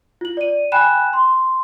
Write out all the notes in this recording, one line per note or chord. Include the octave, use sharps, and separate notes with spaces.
F4 F#7
D5 D#7
G5 G#5 B5 F#6 E7
C6